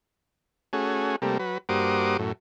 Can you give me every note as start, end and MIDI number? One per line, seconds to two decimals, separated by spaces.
0.73 1.16 57
0.73 1.16 61
0.73 1.16 66
0.73 1.16 68
1.22 1.38 48
1.22 1.38 55
1.22 1.38 57
1.22 1.38 58
1.39 1.58 54
1.39 1.58 71
1.69 2.17 43
1.69 2.17 58
1.69 2.17 66
1.69 2.17 72
1.69 2.17 86
1.69 2.17 87
2.19 2.32 42
2.19 2.32 45